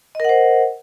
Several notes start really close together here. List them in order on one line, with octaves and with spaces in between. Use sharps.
D#5 A#4 F#5 C5